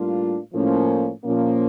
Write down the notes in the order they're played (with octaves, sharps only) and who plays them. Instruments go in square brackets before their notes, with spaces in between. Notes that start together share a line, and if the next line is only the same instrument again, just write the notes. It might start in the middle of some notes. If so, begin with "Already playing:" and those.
Already playing: [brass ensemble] A2 G3 A#3 D4 F4
A2 F3 A#3 C#4
A#2 F3 A#3 C#4